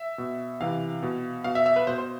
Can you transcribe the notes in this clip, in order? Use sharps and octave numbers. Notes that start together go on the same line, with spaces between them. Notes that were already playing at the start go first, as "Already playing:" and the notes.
Already playing: E5
B2
C3 E3 F5
B2
B2 F5
E5
E5
B4
B2 C5
C5